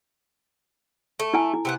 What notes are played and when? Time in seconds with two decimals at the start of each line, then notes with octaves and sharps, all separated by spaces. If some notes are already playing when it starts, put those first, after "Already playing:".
1.20 A3
1.34 E4 G#5
1.54 E4
1.65 C3 B3 F#5